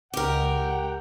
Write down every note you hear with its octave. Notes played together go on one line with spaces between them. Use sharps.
C#2 G4 A#4 F#5 G5